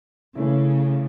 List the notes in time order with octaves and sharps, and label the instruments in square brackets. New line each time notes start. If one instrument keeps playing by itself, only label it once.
[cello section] C#3 [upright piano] E3 A3 C#4 E4